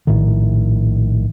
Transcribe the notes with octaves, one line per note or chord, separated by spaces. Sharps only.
A#1 A2 D#3